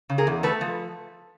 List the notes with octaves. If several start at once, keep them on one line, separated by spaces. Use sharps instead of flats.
C#3
G#4 A#4
E2
A3 A4 B4
F3